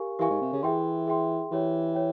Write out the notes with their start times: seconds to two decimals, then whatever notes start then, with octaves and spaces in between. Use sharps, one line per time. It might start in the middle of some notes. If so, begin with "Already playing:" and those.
Already playing: G4 A#4 F5 G#5 C#6
0.19 E3 G4 A#4 F5 G#5 C#6
0.30 G#2
0.41 C3
0.53 C#3
0.63 E3 G#4 E5 G5 C6
1.07 G#4 E5 G5 C6
1.51 E3 G4 C#5 G5
1.95 C#5 G5